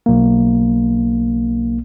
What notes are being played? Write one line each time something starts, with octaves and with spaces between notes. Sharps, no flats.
B1 A#3